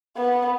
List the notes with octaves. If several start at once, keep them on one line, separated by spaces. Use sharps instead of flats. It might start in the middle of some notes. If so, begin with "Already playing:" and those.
B3